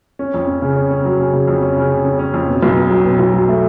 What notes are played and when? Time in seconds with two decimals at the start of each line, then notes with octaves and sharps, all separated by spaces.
0.19 C#4
0.34 F2
0.48 C#4
0.62 C#3
0.76 C#4
0.91 C#4
1.05 F#3
1.19 C#3
1.33 C#3
1.48 F2
1.62 C#4
1.77 C#3
1.91 C#3
2.05 C#4
2.19 C#4
2.34 F2
2.48 B2
2.63 B1
2.76 B2
2.91 F#3
3.05 B2
3.19 B1
3.34 F#3
3.48 A3